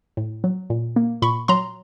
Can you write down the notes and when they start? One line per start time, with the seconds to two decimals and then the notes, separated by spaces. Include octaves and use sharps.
0.17 A2
0.44 F#3
0.70 A#2
0.96 A#3
1.22 A#2 B5 C#6
1.48 F#3 A#5 C6